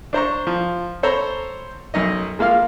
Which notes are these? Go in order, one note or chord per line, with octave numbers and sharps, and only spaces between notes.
D4 C5 A#5 C#6
F3
A4 C5 C#5 A#5 B5
B1 F#2 D#4 D#5
G#3 A#3 F4 F5 F6